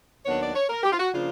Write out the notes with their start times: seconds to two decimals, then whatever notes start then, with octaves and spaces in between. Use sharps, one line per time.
0.25 D#2 D#3 F#3 B3 D4 C#5
0.40 D5
0.54 C#5
0.69 A#4
0.83 G4
0.92 F4
0.98 F#4
1.13 C#3 F3 A#3 D4 F4